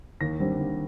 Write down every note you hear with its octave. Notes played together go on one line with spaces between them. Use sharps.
D#2 A#6
D3 G3 C4
D#2